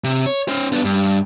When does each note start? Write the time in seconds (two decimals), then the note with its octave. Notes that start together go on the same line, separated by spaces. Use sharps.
0.04 C3
0.26 C#5
0.48 C#4 C5
0.72 B3 D4
0.84 G2